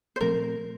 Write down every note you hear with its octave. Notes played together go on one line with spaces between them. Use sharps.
C5
A#2 F3 A3 C4 A#4